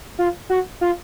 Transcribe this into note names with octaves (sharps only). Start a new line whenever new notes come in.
F4
F#4
F4